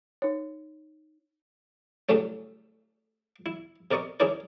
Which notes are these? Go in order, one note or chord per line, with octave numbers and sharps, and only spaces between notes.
D#4 C#5
A2 C#3 F#3 G3 A3 C#4
E4
C3 A#4 D5 D#5 C#6 D#6
C#4 D#4 E4 G#4 A#4 D5